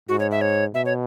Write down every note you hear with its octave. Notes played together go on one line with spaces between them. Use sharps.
G#2 F#4
C#5
E5
C#5
B2 E5
C#5